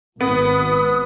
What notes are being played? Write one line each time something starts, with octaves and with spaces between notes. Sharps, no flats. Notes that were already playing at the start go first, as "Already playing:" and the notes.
G#1 B3 B4 D#6